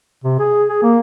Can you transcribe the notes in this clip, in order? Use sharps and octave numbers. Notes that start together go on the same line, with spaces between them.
C3
G#4
G#4
A#3